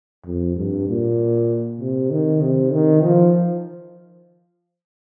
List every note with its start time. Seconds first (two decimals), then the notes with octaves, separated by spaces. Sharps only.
0.25 F2
0.56 G2
0.88 A#2
1.80 C3
2.10 D#3
2.41 C3
2.72 D#3
3.03 F3